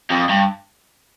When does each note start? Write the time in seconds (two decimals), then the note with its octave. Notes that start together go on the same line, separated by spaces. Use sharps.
0.10 F2
0.29 G2